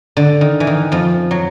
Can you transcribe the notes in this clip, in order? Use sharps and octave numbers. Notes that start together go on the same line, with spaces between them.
D3
D#3
E3
D#3
F2 F3
F#3